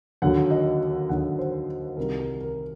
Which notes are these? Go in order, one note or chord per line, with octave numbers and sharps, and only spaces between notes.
D#2 D3 F#3 F#5
D#5
D#2 D3 F#3 F#5
C5
C2 C3 D#3 G3 A#4
A#4
A#4